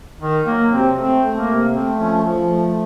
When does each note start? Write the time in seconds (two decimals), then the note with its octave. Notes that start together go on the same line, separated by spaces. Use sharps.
0.21 D#3 D#4
0.46 F#3 A#3
0.71 C3 C4
0.97 A3 C4
1.22 A3
1.35 A#3
1.47 C3
1.73 A3 C4
1.98 F3 C#4
2.24 F3
2.49 A3